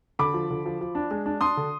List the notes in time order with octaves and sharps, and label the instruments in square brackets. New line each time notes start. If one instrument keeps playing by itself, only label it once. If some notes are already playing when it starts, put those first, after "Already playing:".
[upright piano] D3 B5 D6
F3
D3
F3
F3
D4
G#3
D4
D4 C6 D#6
D3